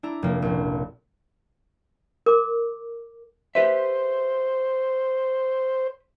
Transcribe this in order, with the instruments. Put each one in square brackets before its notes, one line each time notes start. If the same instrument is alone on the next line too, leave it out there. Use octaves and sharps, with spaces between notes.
[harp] D4 E4 A#5
F1 A#3
A#1 C#4
[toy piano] A#4 D6
[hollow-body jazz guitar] G4 B4 E5 [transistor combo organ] C5